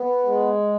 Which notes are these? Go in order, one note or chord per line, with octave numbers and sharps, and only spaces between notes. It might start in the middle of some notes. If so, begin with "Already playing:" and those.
Already playing: B3
G#3